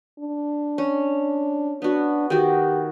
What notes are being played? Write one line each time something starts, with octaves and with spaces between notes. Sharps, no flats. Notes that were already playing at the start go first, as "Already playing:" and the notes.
D4
C#4
B3 D4 F#4
D#3 F#4 G4